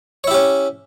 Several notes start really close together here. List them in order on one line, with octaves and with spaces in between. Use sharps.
C#5 E4 G4 C#4